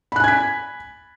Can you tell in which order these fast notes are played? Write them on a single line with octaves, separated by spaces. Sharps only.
B5 F#6 G#5 G#6 B6